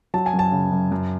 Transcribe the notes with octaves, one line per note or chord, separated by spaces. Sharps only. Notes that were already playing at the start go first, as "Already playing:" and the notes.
F#3 A5
G#5
F#2
A5
C#3
F#2
F#2